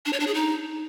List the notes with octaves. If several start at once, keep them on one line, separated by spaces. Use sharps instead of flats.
D4
C#5
D4
G#4
D#4